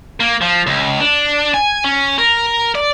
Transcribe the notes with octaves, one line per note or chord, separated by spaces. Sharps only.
A#3
F3
C#2
D4
G#5
C#4
A#4
D5